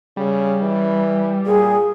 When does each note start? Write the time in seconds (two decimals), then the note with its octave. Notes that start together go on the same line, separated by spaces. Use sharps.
0.17 C#3 G3
0.62 E3
1.46 A#2 G#4